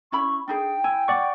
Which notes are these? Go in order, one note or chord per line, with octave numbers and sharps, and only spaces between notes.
C#4 E4 B5 C#6
D4 D#4 G#4 G5
E4 G#5
D5 F#5 C#6